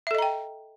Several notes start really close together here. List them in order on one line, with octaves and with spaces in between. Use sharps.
E5 A4 D#5 A#5 G5